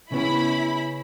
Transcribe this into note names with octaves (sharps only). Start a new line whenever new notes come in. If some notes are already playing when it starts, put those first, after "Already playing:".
C#3 B3 C#4 E4 B5